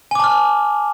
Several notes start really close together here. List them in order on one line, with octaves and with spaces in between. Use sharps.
G#5 D6 A5 F6